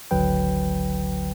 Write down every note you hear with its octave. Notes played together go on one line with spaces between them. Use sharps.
G#1 D2 D3 F#3 B4 G5